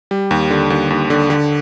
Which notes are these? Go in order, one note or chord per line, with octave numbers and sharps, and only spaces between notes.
G3
D#2
D3
D#2
D#2
D3
D3